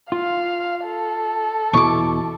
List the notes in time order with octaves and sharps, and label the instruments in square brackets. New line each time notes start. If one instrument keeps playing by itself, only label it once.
[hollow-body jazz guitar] F4 [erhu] F5
[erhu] A4
[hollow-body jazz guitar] E2 B2 E4 [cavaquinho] C#6 D6